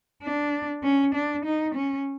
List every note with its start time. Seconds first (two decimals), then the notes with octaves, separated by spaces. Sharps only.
0.23 D4
0.83 C#4
1.14 D4
1.45 D#4
1.75 C#4